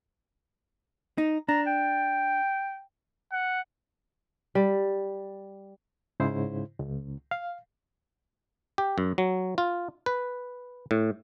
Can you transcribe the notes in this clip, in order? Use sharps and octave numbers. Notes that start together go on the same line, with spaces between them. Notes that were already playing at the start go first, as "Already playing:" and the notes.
D#4
D4 A#5
G5
F#5
G3
G#2 C#3 E4 C5
C#2
F5
G4
F#2
F#3
F4
B4
A2